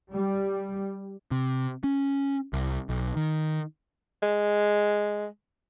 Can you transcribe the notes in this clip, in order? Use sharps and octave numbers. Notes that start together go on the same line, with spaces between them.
G3
C3
C#4
C2
B1
D#3
G#3